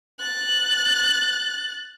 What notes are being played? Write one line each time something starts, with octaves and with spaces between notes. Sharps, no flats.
F#6 A6